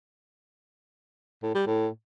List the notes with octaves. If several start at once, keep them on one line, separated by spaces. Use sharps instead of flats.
A2
G3
A2